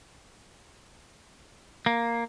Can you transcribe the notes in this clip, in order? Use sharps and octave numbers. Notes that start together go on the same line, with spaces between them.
A#3